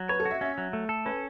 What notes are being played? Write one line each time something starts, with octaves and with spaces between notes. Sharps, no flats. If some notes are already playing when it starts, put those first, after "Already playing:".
Already playing: F#3
B4 C#5
A4
F#4
E5
C#4 E5
F#3
A3
A4
C#4 B4